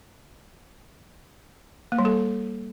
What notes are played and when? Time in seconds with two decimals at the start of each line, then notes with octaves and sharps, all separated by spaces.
1.92 A#3
1.99 G3
2.05 A4